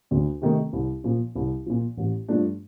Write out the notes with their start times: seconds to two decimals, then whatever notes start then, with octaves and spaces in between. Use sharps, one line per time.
0.11 D2
0.42 C3 D#3 A3
0.73 C2
1.04 A#2 F3
1.35 C2
1.66 A#2 F3
1.97 A1
2.28 G2 F3 A3 D4